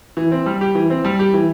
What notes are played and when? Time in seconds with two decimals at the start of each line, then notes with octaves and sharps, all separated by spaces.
0.17 E3
0.32 C4
0.46 G3
0.61 G4
0.75 E3
0.90 C4
1.05 G3
1.19 G4
1.34 E3